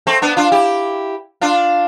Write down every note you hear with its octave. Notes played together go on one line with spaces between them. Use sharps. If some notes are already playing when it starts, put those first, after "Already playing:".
A3 C4
B3 D4
D4 F4
E4 G4
D4 F4